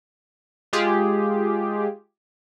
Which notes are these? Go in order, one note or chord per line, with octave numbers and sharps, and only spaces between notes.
G#3 F4 G4 G#4